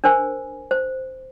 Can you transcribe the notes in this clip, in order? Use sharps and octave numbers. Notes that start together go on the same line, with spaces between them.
D4 A#4 C5 G#5
C5